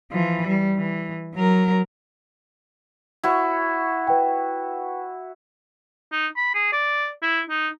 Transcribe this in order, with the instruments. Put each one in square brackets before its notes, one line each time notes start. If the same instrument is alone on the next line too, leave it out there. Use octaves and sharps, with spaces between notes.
[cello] E3 F3
G3
E3
F#3 A#4
[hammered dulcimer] E4 F#4 C#5
[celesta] B4 G5
[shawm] D#4
B5
G#4
D5
E4
D#4